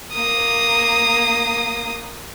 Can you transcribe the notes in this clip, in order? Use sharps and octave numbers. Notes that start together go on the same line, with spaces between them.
A#3 D#6